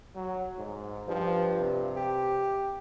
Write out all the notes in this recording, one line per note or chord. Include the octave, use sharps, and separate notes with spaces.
F#3
G#2
G2 F3
C3
G4